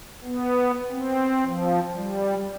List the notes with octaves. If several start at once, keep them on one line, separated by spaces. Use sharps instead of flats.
B3
C4
F3
G3